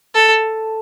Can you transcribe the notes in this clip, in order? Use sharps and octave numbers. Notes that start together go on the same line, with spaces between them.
A4